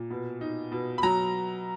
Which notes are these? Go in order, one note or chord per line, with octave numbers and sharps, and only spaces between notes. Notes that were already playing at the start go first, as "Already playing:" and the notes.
Already playing: A#2
B2
D#4
B2
B5
F#3 A#5